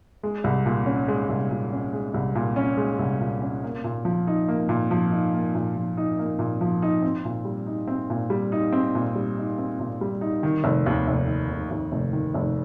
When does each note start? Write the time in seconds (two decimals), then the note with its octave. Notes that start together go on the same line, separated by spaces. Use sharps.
0.23 G#3
0.44 C2
0.66 A#2
0.86 C#4
1.08 G#3
1.29 C2
1.51 A#2
1.72 C#4
1.93 G#3
2.14 C2
2.35 A#2
2.56 C#4
2.77 G#3
2.99 C2
3.21 A#2
3.41 C#4
3.64 A#3
3.84 A#2
4.05 F3
4.27 D#4
4.48 A#3
4.69 A#2
4.91 F3
5.11 D#4
5.33 A#3
5.55 A#2
5.76 F3
5.97 D#4
6.19 A#3
6.39 A#2
6.61 F3
6.82 D#4
7.02 C4
7.25 A#2
7.45 G3
7.66 D#4
7.87 C4
8.10 A#2
8.30 G3
8.52 D#4
8.72 C4
8.95 A#2
9.15 G3
9.37 D#4
9.58 C4
9.80 A#2
10.01 G3
10.21 D#4
10.43 D#3
10.64 F1
10.86 D#2
11.07 F1
11.28 D#3
11.49 F1
11.71 D#2
11.92 F1
12.13 D#3
12.34 F1